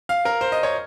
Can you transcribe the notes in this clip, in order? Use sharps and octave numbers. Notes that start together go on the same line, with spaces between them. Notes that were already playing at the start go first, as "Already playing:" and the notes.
F5
A#4
C5
D#5
C#5